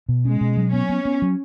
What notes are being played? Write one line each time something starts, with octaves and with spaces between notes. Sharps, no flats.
B2
G#3 C#4
B2
F#3
B3 C#4
B3
B3
F#3